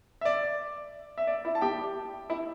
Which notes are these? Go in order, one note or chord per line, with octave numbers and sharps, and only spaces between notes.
E5
D5
E5
D5
E4 E5
A5
G4 G5
E4 E5